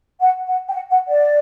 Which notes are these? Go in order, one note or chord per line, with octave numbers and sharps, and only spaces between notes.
F#5
F#5
G5
F#5
F#5
D5